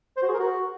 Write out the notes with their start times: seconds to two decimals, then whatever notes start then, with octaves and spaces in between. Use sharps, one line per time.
0.17 C5
0.23 F#4
0.28 G#4
0.34 A#4
0.40 F#4